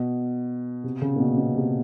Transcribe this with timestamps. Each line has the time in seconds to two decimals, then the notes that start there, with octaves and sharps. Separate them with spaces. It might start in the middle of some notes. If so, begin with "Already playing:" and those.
Already playing: B2
0.84 C3
1.02 C#3
1.16 A#2
1.20 B2
1.38 B2
1.56 C3